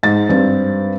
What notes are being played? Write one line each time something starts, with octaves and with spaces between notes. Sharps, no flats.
G#2 A6
G2 C4